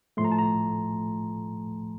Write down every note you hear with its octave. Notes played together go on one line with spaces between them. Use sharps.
A2 F3 A3 C6
A#5
A5
A#5